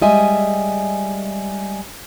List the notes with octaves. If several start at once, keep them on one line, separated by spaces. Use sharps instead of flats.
G3 G#3 D#5 E5 G#5